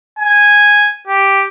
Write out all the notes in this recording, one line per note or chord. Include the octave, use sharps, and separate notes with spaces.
G#5
G4